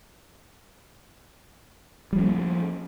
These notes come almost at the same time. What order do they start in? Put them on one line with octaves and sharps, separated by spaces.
G3 F3 C#4 A#3